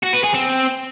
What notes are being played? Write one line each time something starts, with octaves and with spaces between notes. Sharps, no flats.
F#4
B4
G#4
C4